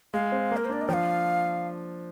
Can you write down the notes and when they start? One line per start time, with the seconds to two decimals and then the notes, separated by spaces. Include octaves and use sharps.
0.14 G#3 F5
0.32 C4
0.51 A#3
0.57 A#4
0.65 C5
0.70 D4 D5
0.81 D#5
0.89 F3 F5 G5